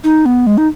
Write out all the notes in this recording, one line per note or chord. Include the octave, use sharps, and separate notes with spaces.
D#4
B3
G#3
D#4